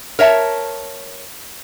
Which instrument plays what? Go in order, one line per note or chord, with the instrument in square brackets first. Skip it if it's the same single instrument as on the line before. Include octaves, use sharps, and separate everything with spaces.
[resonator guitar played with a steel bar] A#4 C#5 E5 A5